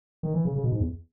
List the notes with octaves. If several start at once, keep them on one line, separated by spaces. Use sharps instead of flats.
D#3
E3
C#3
C#3
B2
G#2
E2